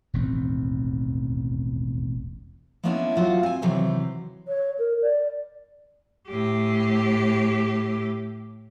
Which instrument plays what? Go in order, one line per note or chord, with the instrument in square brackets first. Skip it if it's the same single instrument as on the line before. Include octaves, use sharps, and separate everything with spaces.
[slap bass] E1 A1 D#2 C4
[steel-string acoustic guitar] G#3 A#3 B3 C#4 D4 E4
F#3 A#3 F4 F#4 F5 F#5
C4 G#5
C3 D#3 E3 F#3 B4 C5
[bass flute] C#5
A#4
D5
[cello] A2 G4